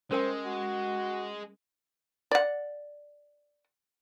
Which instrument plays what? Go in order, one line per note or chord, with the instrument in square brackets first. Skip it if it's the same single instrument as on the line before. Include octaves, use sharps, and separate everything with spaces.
[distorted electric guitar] G#3 [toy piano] C#4 A#4 G5 [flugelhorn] C5
[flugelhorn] F#4
[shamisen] D5 F#5